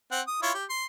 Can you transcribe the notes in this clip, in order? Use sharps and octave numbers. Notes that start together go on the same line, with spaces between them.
C4 F#5
D#6
E4 F4 C#5
G4
C6